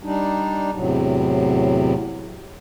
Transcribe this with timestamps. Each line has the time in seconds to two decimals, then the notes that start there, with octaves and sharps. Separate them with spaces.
0.03 G3 D4 D#4
0.75 E2 A2 C3 F#3